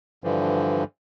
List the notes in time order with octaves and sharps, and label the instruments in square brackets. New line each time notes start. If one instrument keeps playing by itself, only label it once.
[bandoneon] G2 D3 E3 F3